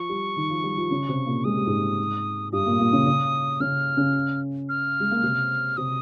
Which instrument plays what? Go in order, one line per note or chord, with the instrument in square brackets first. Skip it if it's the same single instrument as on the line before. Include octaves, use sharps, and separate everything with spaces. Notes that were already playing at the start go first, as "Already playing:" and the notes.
Already playing: [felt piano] F3 F4 [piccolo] C#6
[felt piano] G3 G4
D#3 D#4
F3 F4
G3 G4
F3 F4
C#3 C#4
C3 C4
A#2 A#3
[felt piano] G#3 [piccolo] D#6
[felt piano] G3
G#2 G#3
[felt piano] G2 G3 [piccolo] D#6
[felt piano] A#2 A#3
A#2 A#3
C#3 C#4
C#3 C#4
[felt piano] C#3 C#4 [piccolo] F6
[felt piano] C#3 C#4
[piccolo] F6
[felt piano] G#3
A#3
C3 C4
[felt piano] C3 C4 [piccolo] D#6